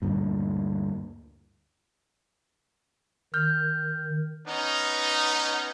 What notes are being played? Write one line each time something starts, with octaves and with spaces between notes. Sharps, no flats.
D2 G2 A#2
D#3 F6 G6
B3 C#4 D#4